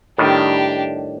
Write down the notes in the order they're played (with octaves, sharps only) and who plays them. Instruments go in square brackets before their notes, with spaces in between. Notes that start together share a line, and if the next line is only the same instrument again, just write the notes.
[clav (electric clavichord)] A2 D#3 G3 [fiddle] D4 G4